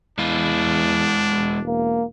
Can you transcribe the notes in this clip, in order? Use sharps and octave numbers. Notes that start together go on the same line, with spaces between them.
E2 G#3 D4 E4 F5
E1
A#3